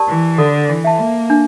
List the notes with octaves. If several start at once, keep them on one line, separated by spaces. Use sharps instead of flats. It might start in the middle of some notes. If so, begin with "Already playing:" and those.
Already playing: G4 A#4 D5 A5
E3
D3 A4
E3
E5 A5
A#3
D4